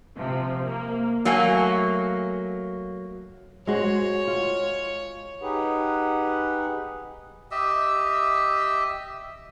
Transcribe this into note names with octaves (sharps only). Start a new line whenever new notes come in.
C3 F3
A#3
F#3 A3 A#3 F5 G#5
G#3 F#4 C5 C#5
F4
D#4 G4 G#4 B4 F#5
G4 D#5 E5 E6